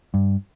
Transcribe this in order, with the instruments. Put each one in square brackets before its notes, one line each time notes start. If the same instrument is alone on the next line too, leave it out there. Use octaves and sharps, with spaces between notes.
[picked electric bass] G2